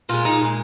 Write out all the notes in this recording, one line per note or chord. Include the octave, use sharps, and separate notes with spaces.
A#2 G#3 F4
D#4
A#2 G#3